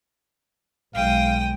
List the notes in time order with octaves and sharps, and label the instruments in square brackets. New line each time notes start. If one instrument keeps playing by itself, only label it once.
[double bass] B1 G#3 [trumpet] F5 [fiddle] G5 D#6